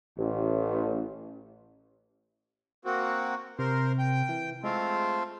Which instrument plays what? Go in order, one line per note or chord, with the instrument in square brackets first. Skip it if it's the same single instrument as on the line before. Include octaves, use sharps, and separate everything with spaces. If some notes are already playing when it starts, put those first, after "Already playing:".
[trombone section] A1
[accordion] A#3 C4 F#4
[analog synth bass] C3 [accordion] A#4 C5
[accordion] G5
[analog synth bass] E3
[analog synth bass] G#3 [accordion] A3 C4 F4